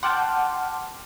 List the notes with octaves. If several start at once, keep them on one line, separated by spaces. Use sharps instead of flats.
F#5 G5 A5 C6 D6 F6